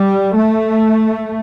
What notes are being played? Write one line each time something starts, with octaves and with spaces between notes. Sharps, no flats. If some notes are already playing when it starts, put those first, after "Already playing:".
Already playing: G3
A3